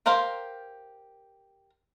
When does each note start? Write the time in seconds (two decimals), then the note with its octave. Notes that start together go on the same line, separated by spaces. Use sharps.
0.06 G4 A#4 C5 F5 A#5